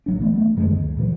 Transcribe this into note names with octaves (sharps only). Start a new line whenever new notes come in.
A#1 F#3 D4
E3 A3 B3
A3
F#2 D#3 F3 G#3
D2
A#2 C#3 E3 F#3